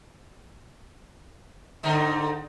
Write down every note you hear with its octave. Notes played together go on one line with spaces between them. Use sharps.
G#2 D3 D#4